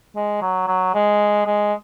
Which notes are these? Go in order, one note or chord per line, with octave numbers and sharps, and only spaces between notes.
G#3
F#3
F#3
G#3
G#3